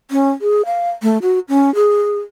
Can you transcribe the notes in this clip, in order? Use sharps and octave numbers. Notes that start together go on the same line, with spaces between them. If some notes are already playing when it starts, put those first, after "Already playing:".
C#4
G#4
F5
A3
F#4
C#4
G#4